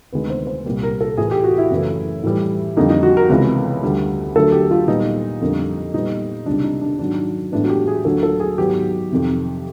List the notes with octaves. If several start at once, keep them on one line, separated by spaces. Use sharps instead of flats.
D2 C3 D#3 G#3 B3 B4
C5
C5
C2 A#2 G3 A#3
A#4
A4
A2 E3 A3 G#4
G4
F#4
E4
F#2 C#3 E3 A3
A2 E3 G3
F2 D3 G3 A#3 D#4
D#4
F#4
A#4
C#2 C3 E3 G#3 B3 B4
D2 D3 G3
D2 D3 F#3 A3 A4
G4
F4
A#2 G3 B3 D#4
F2 D3 G3 A#3
A#2 G3 B3 D#4
C#2 C3 D#3 G3 D4
D#4
D4
G#2 D#3 F#3 D4
A2 E3 G#3 B3 D4
F#4
G4
G#4
D2 D3 F#3 A#3 A4
A4
G#4
G#2 D#3 F#3 B3 G4
F2 C3 D#3